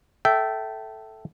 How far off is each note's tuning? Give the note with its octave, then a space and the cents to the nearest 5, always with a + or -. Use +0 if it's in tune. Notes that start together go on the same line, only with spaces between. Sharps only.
A4 +0 E5 +0 G5 -20